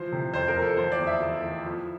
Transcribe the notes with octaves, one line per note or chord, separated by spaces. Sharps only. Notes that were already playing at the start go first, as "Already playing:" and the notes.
Already playing: E3 F3 C5
C3
F2 C5
A#4
F2
A4
E3 C5
D5
E2
E5
E3
E3
F3